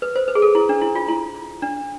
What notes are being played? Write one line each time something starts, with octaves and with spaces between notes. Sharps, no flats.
B4
C5
B4
G#4
A4
E4
D4
E4
F4
E4
D4